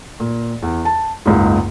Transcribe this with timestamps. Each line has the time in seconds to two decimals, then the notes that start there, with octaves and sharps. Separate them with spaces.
0.20 A#2
0.62 E2
0.85 A5
1.25 F#1 C#2 G#2